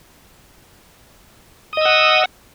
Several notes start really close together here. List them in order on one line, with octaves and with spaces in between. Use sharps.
D#6 D#5 E6 F#5